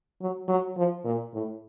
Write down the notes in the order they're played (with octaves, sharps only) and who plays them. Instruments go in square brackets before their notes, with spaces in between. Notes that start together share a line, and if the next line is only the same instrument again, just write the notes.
[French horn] F#3
F#3
F3
A#2
A2